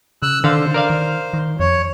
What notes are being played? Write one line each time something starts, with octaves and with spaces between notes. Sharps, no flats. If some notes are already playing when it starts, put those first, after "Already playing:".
C#3 E6 F#6
D3 D#3 C5 F5
A#4 D5 F5
D#3
D#3
F2 C#5